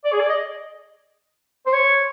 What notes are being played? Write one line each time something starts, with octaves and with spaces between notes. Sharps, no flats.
D5
G#4
D5
D#5
C5
C#5